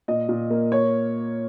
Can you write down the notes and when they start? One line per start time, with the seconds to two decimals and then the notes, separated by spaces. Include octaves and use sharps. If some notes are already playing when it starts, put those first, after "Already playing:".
0.08 A#2 D#5
0.29 A#2
0.50 A#3
0.72 C#5